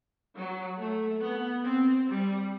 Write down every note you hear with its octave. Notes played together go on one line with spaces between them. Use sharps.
F#3
A3
B3
C4
G3